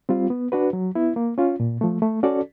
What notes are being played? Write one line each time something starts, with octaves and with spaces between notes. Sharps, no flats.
G3 C4 F4
B3
D4 F#4 B4
F#3
B3 E4
A#3
C#4 F4
A#2
F3 A3
A3
C#4 F#4 A4 D5